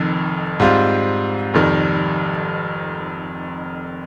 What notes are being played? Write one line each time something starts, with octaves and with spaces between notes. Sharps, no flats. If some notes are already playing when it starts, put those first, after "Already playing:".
Already playing: F1 F2 D#3
G#2 G3 C4 F4
F1 F2 D#3 G3